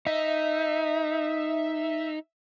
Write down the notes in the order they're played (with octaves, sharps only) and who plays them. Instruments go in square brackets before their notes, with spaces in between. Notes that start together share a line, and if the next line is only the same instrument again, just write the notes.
[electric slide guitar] D#4 [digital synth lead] E5